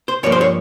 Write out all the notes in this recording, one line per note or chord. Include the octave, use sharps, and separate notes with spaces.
C5
G2 F3 A#3 C#5
C5
C#5